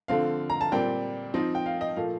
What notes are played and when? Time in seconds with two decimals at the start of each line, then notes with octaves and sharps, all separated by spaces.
0.08 D3 F3 A3 C4 F5
0.50 A#5
0.61 A5
0.72 A#2 G3 C4 G5
1.34 F3 C4 D#4
1.55 G5
1.66 F5
1.81 D#5
1.96 A#2 F3 A3 F5